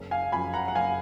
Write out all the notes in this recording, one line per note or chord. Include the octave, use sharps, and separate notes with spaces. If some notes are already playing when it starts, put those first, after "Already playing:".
Already playing: F#1
F5 G#5
F#2 F3 G#5 B5
F#5 A#5
F#5
F#1 F5 G#5